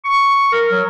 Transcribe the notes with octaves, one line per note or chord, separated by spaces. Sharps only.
C#6
A#4
F#3